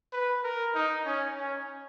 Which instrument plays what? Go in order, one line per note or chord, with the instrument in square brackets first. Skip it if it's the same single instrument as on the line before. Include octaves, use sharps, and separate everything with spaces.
[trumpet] B4
A#4
D#4
C#4
C#4